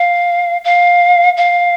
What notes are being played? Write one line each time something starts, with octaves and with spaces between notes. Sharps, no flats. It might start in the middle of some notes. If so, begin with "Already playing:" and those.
Already playing: F5
F5
F5